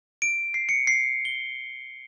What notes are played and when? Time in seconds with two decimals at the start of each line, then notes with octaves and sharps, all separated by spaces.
0.22 D7
0.54 C7
0.69 C#7
0.87 C7
1.25 G7